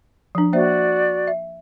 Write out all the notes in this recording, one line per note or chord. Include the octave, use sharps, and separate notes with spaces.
F3 D4
A#3 F#4 C5 D5 E5
E5